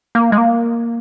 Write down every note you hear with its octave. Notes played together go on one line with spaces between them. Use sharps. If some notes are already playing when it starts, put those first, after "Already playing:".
A#3
G#3
A#3